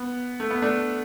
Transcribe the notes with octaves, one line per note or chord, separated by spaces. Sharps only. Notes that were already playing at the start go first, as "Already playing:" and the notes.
Already playing: B3
A3
B3
A3 D4